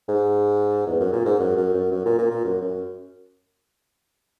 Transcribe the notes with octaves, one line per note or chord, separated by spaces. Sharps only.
G#2
E2
F#2
A#2
G#2
F#2
F#2
F#2
F#2
A#2
A#2
A#2
F#2
F#2